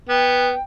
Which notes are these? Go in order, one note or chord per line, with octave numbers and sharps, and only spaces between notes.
B3 G5